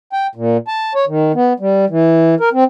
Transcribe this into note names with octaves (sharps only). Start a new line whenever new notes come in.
G5
A#2
A5
C#5
D#3
B3
G3
E3
A#4
C4